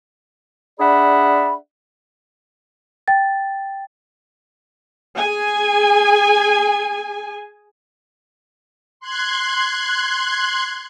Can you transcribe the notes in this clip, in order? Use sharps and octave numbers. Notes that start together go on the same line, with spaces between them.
D4 G#4 D5 E5 F#5 B5
G5 A6
G#4 G#5
C6 F#6 G#6